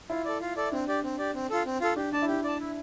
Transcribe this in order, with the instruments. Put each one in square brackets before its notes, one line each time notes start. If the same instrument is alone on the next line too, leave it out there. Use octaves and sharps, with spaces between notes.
[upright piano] E4 [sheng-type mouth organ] F4
[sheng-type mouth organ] A4 D5
F4
A4 D5
[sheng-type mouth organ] C4 [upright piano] D4
[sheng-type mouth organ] G4 D5
C4
G4 D5
C4
F4 A4
C4
F4 A4
[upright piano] D4 [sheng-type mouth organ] G4
[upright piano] D4 [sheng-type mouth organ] D5 A5
[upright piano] E4
[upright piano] D4 [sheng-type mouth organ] G4
[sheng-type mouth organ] D5 A5
E4